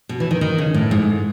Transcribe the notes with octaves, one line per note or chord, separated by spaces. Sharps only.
B2
E3
D#3
D#3
C#3
A2
G#2